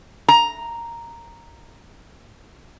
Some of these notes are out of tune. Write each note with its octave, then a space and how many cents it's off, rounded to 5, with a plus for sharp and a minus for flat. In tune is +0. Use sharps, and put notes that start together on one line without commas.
A#5 -5